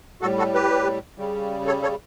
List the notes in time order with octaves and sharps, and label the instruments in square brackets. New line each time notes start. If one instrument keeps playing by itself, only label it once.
[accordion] A2 F#4 A4
G3
F#4 A4
G4 B4
C#3 G3
A4 C#5
A4 C#5